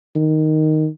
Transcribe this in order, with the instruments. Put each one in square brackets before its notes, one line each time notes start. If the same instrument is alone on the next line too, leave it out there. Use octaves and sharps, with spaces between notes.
[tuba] D#3